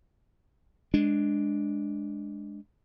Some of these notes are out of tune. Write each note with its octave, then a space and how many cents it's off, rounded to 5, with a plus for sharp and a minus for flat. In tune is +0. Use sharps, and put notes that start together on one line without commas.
G#3 +0 D4 +0